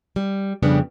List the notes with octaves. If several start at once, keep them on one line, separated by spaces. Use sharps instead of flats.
G3
F2 C#3 G3 B3 D4